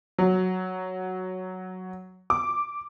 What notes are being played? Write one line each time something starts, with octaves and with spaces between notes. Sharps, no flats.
F#3
D6